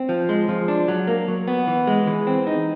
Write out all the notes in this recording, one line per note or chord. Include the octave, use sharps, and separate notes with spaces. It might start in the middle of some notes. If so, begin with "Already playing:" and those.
Already playing: C4
F3
G#3
F3
D4
F#3
A#3
F#3
B3
E3
G#3
E3
C4
D#4